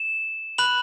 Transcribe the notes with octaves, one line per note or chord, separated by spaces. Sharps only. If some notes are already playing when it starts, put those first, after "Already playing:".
Already playing: E7
B5 F#6 F#7